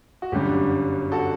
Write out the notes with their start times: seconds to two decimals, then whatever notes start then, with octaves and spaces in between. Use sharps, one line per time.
0.22 F#4
0.32 G1 F#2 D3 G3 G4
1.12 F#4 A4